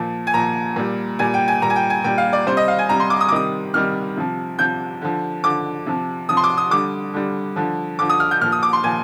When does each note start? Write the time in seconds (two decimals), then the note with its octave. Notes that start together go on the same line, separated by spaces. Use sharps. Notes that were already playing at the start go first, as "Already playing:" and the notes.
Already playing: A#2 F3
0.27 G#5
0.34 A#2 F3 A#5
0.76 A#2 G3
1.19 A#2 G3 G#5
1.34 G5
1.48 G#5
1.62 A#2 G3 A#5
1.70 G#5
1.76 G5
1.90 G#5
2.04 A#2 G3 G5
2.18 F5
2.33 D5
2.47 C3 G3 C5
2.57 D#5
2.68 F5
2.79 G#5
2.89 C3 G3 A#5
3.00 C6
3.10 D6
3.21 D#6
3.28 D6
3.31 C3 D#3 G3 D#6
3.74 C3 D#3 G3 F6
4.17 C3 F3
4.59 C3 F3 G6
5.02 D3 F3
5.44 D3 F3 D6
5.86 C3 F3
6.29 C3 F3 D#6
6.37 C6
6.44 D6
6.57 D#6
6.71 D3 G3 D6
7.14 D3 G3
7.56 D3 F3
7.99 D3 F3 D6
8.09 D#6
8.20 F6
8.31 G6
8.41 A#2 F3 F6
8.52 D#6
8.63 D6
8.73 C6
8.84 A#2 F3 G#5